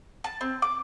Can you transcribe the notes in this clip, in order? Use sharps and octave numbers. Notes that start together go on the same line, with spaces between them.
A5
C4
D6